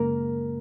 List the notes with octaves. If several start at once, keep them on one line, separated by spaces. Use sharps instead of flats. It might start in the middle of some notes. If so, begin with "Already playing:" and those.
Already playing: F#2 C#3 G#3 A#3 A#4